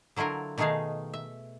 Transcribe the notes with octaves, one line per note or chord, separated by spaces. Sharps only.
D3 F#3 E4 F4 A#4
B2 D#3 A3 D#4 G#4 F5
E5